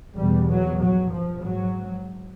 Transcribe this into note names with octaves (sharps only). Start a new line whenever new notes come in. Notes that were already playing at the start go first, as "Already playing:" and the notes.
E2 B2 G3
F#3
G2 F#3
F3
G#2 F#3